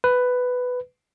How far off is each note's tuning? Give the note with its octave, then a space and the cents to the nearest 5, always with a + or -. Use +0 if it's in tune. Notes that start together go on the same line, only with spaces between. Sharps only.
B4 +10